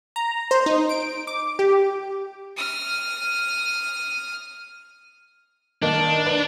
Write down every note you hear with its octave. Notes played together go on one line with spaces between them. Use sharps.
A#5
C5
D#4
D7
D6
G4
D#6 F6
D#3 A#3 D4 D#4
B4 D5